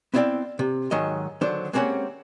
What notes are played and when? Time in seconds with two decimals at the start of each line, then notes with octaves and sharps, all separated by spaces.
0.14 B3 C4 E4 D5 F5 G5
0.59 C3
0.91 G#2 D#3 F#3 D#5
1.41 D3 D#3 F#3 D4 C5
1.73 G#3 A#3 C4 C#4 G4 F#5